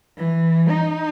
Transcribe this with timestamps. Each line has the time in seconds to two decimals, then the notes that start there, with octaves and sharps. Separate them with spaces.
0.17 E3
0.70 D#4